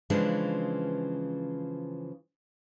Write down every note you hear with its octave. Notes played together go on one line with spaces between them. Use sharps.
C#3 E3 F3 G#3 D4